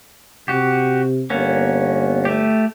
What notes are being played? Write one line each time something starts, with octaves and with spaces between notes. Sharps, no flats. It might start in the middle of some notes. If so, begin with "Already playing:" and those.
C3 F#4 G4
G1 A#3 B3 C#4
A3 G4